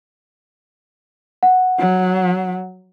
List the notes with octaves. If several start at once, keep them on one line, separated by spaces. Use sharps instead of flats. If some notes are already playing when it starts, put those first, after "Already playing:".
F#5
F#3